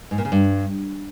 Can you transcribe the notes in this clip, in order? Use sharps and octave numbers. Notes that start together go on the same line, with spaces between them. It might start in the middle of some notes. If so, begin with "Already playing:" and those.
G#2
A#2
C#3
G2